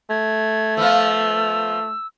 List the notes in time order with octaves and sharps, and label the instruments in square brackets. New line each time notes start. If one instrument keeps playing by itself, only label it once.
[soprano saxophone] A3 [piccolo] G#6
[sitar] F3 B3 F4 [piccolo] E6